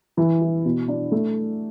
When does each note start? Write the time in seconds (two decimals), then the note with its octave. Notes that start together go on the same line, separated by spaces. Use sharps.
0.17 E3
0.41 E4
0.65 B2
0.88 D4
1.12 A3